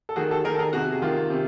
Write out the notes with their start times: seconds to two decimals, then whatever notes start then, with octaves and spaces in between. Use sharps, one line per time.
0.09 A4
0.16 D#3 F#4 G#4
0.30 G4 A4
0.44 D#3 G#4 A#4
0.54 A4
0.59 G#4 A#4
0.73 C3 F#4 G#4
0.92 G#4
1.02 D#3 F4 G4
1.30 C3